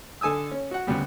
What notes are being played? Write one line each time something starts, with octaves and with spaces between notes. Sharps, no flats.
D3 A4 G#5 D#6 E6
C#4
F#4 F#5
D2 C#3 G3 B3